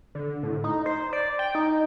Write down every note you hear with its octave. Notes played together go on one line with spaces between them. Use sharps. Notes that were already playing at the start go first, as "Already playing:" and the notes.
D3
A2
D#4
C5
D5
G5
D#4